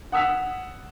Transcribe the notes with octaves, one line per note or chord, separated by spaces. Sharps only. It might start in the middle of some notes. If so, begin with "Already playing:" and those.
F#5 D#6 E6 B6 F7